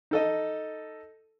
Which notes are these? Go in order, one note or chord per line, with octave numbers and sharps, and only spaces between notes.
D#4 A4 D#5